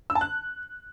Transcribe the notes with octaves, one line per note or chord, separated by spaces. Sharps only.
E6
A5
F#6